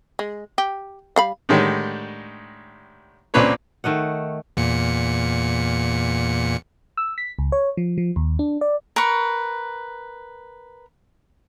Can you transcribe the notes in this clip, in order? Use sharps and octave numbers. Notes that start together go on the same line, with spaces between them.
G#3
G4
G3 F5 B5
A2 D3 D#3 G3 G#3
C#2 A#2 C4 D4 B4 C#5
D#3 A3 D#5 F#5
E2 A#2 C#7
E6
B6
C#2
C#5
F3
F3
D#2
D4
D5
A#4 B4 C#6